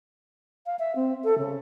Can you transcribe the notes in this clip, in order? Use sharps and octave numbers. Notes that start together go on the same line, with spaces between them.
F5
E5
C4
A4
C#3